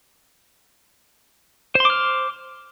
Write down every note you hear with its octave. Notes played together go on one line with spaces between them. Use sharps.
C5 C6 D6 F6